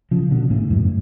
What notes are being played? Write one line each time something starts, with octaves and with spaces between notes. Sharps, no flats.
C#3 F3
B2 D3
A2 C#3
F#2 A2